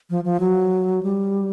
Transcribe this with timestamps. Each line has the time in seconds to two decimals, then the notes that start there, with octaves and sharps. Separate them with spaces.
0.10 F3
0.24 F3
0.40 F#3
1.03 G3